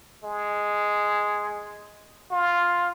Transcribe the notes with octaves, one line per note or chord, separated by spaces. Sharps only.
G#3
F4